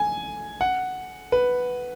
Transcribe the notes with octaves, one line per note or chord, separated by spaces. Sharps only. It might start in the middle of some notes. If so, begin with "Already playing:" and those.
Already playing: G#5
F#5
B4